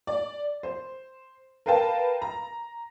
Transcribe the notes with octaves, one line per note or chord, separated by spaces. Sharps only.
D5
C5
A#4 B4 F5 G5 A5
A#5